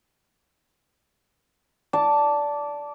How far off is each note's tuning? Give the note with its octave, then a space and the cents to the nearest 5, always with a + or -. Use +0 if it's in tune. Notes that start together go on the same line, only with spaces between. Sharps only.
D5 -15 A5 +0